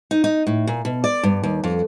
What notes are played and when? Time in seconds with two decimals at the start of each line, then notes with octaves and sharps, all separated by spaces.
0.11 D#4
0.24 D#4
0.47 A2
0.67 A#2
0.85 B2
1.04 D5
1.23 G2
1.43 D#2
1.64 F2